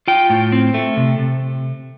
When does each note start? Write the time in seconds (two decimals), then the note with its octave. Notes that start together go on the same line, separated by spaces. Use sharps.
0.08 F4 G5
0.30 A2
0.52 C4
0.74 A3
0.97 C3
1.19 C3